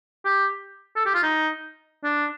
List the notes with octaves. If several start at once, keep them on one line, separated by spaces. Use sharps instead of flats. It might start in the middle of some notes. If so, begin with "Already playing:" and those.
G4
A4
G4
F4
D#4
D4